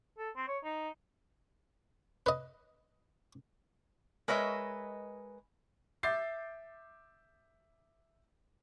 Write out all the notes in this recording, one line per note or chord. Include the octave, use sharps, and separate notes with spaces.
A4
C4
C#5
D#4
B4 D#5
G#3 A#4 B4 C#5 D#5 E5
E5 D6 G6 A6 C7